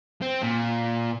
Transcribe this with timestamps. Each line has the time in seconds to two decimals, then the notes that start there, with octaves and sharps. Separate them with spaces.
0.22 C4
0.43 A#2